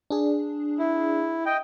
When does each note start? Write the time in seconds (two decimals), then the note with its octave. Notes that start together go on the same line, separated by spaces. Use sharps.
0.10 D4 G#4
0.79 E4
1.46 D#5 G5